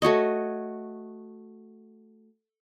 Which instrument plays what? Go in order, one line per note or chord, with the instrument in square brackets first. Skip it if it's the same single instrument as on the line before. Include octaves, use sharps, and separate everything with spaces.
[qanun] A3 F#4 C#5 D#5